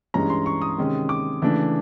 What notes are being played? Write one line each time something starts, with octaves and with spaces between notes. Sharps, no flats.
G2 E3 G#3 C#4 A#5
C6
C#6
D#6
C3 D#3 G#3 C#4
D6
C#3 E3 A3 D4